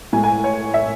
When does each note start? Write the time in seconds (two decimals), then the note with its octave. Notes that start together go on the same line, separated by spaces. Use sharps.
0.13 A2 G#3 G#5
0.24 G#5
0.44 C#5
0.74 E5